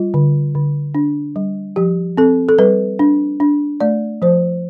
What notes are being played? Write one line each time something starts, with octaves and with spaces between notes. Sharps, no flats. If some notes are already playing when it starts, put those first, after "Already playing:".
Already playing: G3 F4
D3
D3
D4
G3
F3 G4
C4 A4
A4
G3 B4
D4
D4
A3 D5
F3 C5